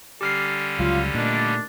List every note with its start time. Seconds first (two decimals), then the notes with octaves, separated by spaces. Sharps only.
0.21 D3 G3 C#4 G4 F6 C7
0.79 C#2 F#3 F4 F5
1.14 A#2 D#3 A3 D4